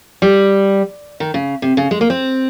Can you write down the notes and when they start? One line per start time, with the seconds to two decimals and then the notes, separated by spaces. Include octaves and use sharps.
0.22 G3
1.20 D#3
1.34 C#3
1.62 C3
1.77 C#3
1.91 G#3
2.01 A#3
2.10 C4